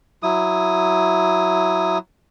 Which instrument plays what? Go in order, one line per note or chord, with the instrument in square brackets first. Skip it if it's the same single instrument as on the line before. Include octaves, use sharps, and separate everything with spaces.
[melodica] F#3 E4 D#6